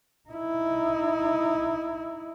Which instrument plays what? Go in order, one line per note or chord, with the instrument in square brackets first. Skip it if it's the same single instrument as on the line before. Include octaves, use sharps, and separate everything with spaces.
[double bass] D#4 E4